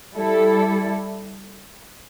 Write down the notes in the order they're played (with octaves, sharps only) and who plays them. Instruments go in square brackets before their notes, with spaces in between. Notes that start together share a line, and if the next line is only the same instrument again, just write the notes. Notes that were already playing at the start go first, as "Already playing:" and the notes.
[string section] G3 E4 A4